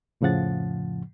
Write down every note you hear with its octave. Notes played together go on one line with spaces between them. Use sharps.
F2 A2 C#3 F3 F#5 A6